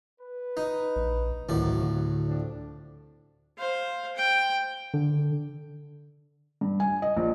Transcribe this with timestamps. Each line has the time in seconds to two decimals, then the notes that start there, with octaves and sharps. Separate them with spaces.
0.19 B4
0.57 D#4
0.96 A#1
1.49 D2 A2 C3 D#3 F3 F#3 D5
1.82 D3
2.27 F3 C4 D4
3.58 C5 F5
4.16 G5
4.94 D3
6.61 G2
6.80 G#5
7.02 D#5
7.17 A#1